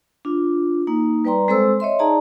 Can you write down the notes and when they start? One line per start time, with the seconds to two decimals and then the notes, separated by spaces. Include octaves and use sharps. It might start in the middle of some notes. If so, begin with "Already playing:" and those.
0.25 D4 F4
0.87 A#3 D#4
1.25 G3 B4 D5 G5 A#5 C6
1.48 G#3 C4 A4 C5 C6 E6
1.80 C#5 D#5 E5 C6
1.99 D#4 G#4 D5 A5 A#5